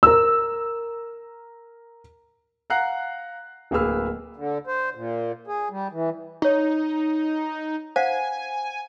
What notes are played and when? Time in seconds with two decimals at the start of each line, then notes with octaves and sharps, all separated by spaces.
0.03 A#4 E6
2.70 F5 F#5 A#5 F#6 C7
3.71 D1 A#3 G#4 B4 E6 F6
4.36 D3
4.67 C5
4.95 A#2
5.47 G#4
5.70 G3
5.92 E3
6.42 D#4 C#5 C#6
7.96 C5 F5 F#5 G#5